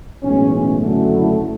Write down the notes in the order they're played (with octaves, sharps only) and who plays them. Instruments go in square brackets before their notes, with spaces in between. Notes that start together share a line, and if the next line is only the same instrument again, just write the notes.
[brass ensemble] B1 A2 E3 G#3 C#4
F#1 F#2 D3 F#3 A3
E4